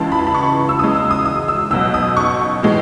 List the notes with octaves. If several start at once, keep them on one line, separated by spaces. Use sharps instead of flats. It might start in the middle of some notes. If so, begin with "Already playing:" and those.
Already playing: C#2 C#3 E3 G#3 A5
B5
A5
B5
C#6
E6
E2 C#3 G#3 D#6
E6
D#6
D#6
E6
B1 B2 F#3 E6
D#6
C#6
A2 E3 G#3